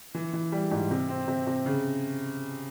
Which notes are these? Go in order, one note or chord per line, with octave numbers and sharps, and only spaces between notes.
E3
E3
G3
G#2
C3
C4
C3
C3
C#3